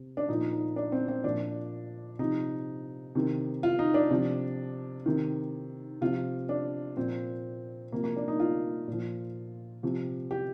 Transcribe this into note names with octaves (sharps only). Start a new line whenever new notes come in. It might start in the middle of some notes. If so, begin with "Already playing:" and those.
Already playing: C3
D4
A#2 F3 D#4
D#4
D4
C4
C4
A#2 F3 D4
C3 F3 D#4
C3 D#3
F4
D#4
D4
C3 F3
C3 D#3
C3 F3 F4
D4
A#2 F3 C4
C3 F3 A#3
A#3
D4
D#4
F4
A#2 F3
C3 F3
G4